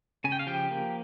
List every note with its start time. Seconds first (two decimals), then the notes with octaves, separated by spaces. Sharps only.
0.24 C#3 G#5
0.32 G5
0.39 F5
0.47 F3 G4 G5
0.71 A#3